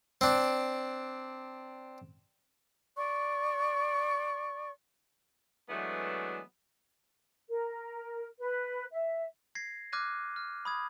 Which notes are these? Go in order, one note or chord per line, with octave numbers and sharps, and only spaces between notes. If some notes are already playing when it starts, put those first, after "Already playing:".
C4 D4
D5 C#6
E3 F#3 G#3 A3 B3 D4
A#4
B4
E5
G#6 A#6 C7
D6 F6 F#6 G#6 A#6 D#7
F6
B5 D#6 G#6